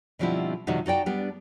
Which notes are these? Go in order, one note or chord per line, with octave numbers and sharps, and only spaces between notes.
B2 D3 F3 G3 C4 E4
C3 D#3 F3 G3 D#4 F#4
D#4 F#4 D5 G5 A5
G3 B3 D4